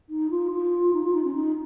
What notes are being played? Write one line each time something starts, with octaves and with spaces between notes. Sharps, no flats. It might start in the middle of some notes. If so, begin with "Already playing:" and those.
D#4
F4
F4
D#4
F4
D#4
C#4
D#4